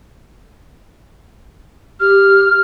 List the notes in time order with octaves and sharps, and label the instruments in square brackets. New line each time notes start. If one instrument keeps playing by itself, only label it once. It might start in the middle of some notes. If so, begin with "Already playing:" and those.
[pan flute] G4 [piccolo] F6